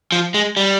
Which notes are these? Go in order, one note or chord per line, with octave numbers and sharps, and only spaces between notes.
F3
G#3
G3